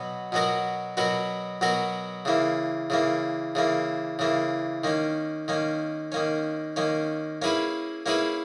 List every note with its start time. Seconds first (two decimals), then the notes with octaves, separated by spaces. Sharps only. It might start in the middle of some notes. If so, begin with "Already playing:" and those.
Already playing: B2 F#3 B3 F#4
0.32 B2 F#3 B3 F#4 A#4
0.97 B2 F#3 B3 F#4 A#4
1.61 B2 F#3 B3 F#4 A#4
2.25 C#3 E3 A#3
2.90 C#3 E3 A#3
3.55 C#3 E3 A#3
4.19 C#3 E3 A#3
4.84 D#3 A#3 C#4
5.48 D#3 A#3 C#4
6.12 D#3 A#3 C#4
6.76 D#3 A#3 C#4
7.42 A#3 C#4 E4 G#4 B4
8.06 A#3 C#4 E4 G#4 B4